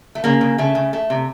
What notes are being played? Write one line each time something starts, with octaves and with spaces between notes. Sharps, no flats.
A3
C#3 A#3
C#3
C#3 A3
C#3
A3
C3